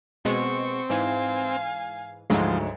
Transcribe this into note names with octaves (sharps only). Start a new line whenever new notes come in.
B2 G#3 B3 C4 C#6
G#2 E3 F5 G#5
D2 G#2 F3 F#3 G#3